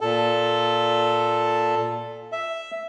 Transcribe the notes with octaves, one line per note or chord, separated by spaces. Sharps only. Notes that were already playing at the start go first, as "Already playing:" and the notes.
A#2 A4
E5